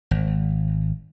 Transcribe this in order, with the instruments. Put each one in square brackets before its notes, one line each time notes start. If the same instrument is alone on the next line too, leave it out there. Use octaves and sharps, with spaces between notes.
[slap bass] G#1